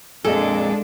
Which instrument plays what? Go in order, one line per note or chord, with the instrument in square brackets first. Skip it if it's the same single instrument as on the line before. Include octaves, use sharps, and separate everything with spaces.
[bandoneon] F2 A#2 D6 [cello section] G#3 D4 [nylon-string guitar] G#4 D#5 [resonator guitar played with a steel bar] A4